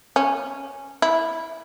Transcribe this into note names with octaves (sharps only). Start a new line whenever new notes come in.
C#4
E4